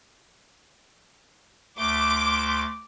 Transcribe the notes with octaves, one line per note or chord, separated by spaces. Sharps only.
D2 A3 C6 D6